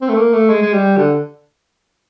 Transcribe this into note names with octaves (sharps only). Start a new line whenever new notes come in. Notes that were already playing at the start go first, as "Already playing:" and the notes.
C4
A3
A#3
A3
G#3
G#3
G3
D3